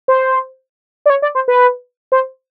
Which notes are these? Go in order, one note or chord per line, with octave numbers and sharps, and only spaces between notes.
C5
D5
C#5
D5
C5
B4
C5